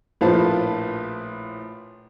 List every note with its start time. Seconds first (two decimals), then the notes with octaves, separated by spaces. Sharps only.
0.21 A#1 A2 F4 B4 C5 A5